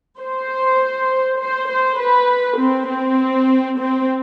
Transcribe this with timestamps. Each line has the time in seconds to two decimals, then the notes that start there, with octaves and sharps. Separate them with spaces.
0.20 C5
1.39 C5
1.69 C5
1.99 B4
2.59 C4
2.89 C4
3.78 C4